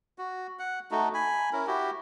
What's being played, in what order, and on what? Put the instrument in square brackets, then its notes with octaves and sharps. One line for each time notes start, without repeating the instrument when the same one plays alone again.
[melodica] F#4
F#5
A3 D#4 F#4
G#5 B5
C#4 E4 A#4
E4 F#4 G4